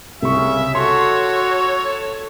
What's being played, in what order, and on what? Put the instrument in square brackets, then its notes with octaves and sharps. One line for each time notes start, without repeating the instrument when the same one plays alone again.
[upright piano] C2 C#6 [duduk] C#3 [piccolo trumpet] E5
[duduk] F#4 [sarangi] A4 [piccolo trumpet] C#5 [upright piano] C6